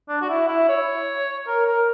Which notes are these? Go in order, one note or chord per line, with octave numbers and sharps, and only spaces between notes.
D4
F#4
E4
E4
C#5
A#4
A#4